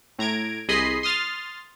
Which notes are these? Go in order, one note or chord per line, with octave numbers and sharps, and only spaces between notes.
A2 A#5 G#6 D7
C2 G#4 D#5 B5 C6 C7
C6 D#6 F6 A6